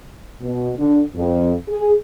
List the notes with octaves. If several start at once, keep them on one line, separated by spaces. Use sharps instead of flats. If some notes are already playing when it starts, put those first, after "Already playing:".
B2
D3
F2
G#4